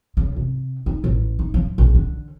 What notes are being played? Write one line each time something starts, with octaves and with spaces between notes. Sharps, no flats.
C#3
C3
D#4
A1
D#4
F3
A#1
D3